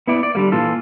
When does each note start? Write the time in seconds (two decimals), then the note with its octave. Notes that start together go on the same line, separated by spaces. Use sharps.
0.07 B3 E4 D5
0.23 D5
0.35 D3 G3 A#3
0.52 A#2 E3 F4 A4